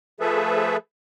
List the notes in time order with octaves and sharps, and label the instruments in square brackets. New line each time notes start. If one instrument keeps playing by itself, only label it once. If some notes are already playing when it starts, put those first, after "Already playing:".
[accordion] F3 A3 G#4 A4 B4 E5